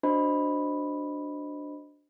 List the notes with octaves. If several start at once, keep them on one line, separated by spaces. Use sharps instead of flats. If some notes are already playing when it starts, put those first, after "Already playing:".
D4 F#4 C5 D#5 B5